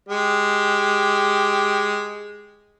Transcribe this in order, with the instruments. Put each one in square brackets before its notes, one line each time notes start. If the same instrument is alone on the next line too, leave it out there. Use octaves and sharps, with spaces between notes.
[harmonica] G#3 G4